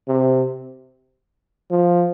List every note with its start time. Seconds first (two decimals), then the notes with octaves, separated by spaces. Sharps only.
0.08 C3
1.71 F3